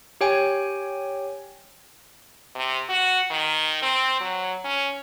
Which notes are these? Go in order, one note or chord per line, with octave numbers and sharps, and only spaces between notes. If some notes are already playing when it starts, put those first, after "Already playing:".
G4 C#5 G5 G#5
C3
F#4
D#3
C4
F#3
C#4